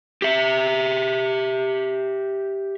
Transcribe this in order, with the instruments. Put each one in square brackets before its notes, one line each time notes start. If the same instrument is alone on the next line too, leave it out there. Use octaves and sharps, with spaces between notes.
[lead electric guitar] G4 E5